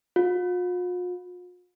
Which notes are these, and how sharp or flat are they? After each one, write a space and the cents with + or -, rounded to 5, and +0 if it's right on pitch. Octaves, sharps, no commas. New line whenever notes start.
F4 +45